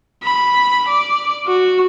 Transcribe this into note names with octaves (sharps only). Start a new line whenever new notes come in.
B5
D5
F#4